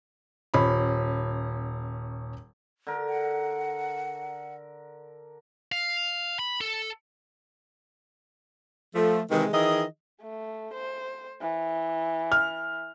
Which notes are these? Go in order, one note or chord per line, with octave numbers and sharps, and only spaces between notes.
D#1 C#4 B5
D3 A#4
F#5
F5
B5
A4
F3 A3
C3 D#3 E3 G#3
D#3 E3 G#4 D#5
A3
C5
E3
F6